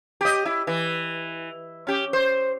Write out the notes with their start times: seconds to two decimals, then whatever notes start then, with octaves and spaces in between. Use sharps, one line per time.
0.21 G4 D#5
0.45 E4
0.67 E3
1.87 C#4 G4
2.13 C5